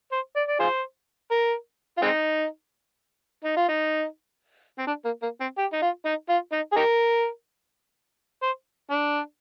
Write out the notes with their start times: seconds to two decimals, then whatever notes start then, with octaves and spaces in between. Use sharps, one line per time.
0.12 C5
0.36 D5
0.48 D5
0.60 F4 G#4 C5
1.31 A#4
1.97 F4
2.02 G#3 C4 D#4
3.44 D#4
3.57 F4
3.69 D#4
4.79 C4
4.87 D4
5.05 A#3
5.22 A#3
5.40 C4
5.58 G4
5.73 D#4
5.82 F4
6.06 D#4
6.29 F4
6.52 D#4
6.72 G#4
6.76 D#4 G4 A#4
8.43 C5
8.91 D4